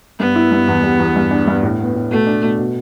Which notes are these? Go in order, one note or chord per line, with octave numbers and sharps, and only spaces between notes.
G2 B3
E4
G2
E2
G3
E2
G2
D4
G2
A2
B3
A2
B2 A3
D4
B2
B2